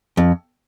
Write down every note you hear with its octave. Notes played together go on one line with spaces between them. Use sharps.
F2